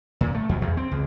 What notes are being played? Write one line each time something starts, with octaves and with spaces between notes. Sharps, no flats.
A#2
A3
F2
E2
C4
C#2